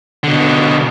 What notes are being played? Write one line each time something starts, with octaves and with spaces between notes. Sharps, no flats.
B2 D3